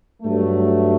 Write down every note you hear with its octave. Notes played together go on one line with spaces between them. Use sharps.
G2 F#3 A3